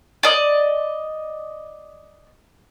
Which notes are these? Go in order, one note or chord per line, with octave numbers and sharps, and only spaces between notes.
D5 D#5